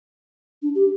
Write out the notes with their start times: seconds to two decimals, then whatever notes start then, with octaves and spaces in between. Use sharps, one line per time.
0.62 D4
0.75 G4